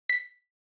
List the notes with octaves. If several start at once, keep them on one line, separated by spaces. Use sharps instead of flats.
B6